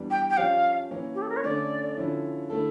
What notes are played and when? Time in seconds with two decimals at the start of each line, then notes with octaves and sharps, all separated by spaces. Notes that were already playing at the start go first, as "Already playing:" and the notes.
Already playing: E2 E3 G3 D4
0.11 G5
0.30 G5
0.37 F3 C#4 G4 D5 F5
0.91 E3 A#3 C#4
1.15 G4
1.22 A4
1.29 A#4
1.37 C#5
1.44 D3 A3 C#4 D5
1.97 D3 F3 C#4 E4
2.50 D3 A3 E4 A4